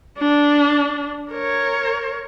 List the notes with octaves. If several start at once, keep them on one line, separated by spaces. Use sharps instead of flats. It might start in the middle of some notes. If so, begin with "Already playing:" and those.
D4
A#4 C#5